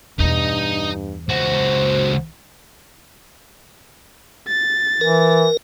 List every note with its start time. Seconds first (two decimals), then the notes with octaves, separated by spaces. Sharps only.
0.19 E2 G2 B2 D#4 D#5
1.29 C#2 F#4 C5
4.48 A6
5.01 E3 A#4